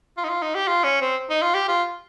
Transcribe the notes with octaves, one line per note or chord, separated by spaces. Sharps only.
F4
D#4
F4
D#4
G4
F4
C#4
C4
D#4
F4
G4
F4